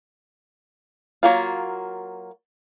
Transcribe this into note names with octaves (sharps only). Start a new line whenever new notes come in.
F#3 A#3 F4